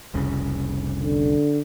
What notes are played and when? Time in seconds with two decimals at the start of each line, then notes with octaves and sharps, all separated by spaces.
0.14 F1 C2 C#3
1.01 D3